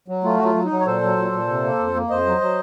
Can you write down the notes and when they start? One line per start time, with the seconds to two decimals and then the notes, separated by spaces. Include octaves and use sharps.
0.08 F#3
0.24 A3 F4
0.37 F#4
0.40 F#3 F4
0.55 F#3
0.65 D#4
0.71 F#3
0.81 C#5
0.86 A#2 A4 C5
1.02 F#3
1.17 A#2
1.32 A#2
1.48 C3
1.64 A#3
1.79 F2
1.95 A#3
2.10 F2 C5 D#5
2.26 F#3
2.41 F#3